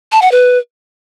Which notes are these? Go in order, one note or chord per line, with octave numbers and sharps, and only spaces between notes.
A5
F#5
B4